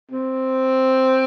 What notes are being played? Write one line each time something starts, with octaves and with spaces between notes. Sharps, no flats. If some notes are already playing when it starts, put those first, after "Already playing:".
C4